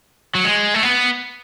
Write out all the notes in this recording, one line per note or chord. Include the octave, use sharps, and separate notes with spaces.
F#3
G#3
A3
B3